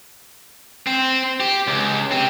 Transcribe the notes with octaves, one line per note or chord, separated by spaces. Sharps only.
C4
G4
C#2
C4 G4